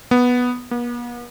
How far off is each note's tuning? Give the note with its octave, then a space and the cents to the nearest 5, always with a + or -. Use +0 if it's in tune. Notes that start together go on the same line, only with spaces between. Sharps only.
B3 -5
B3 -45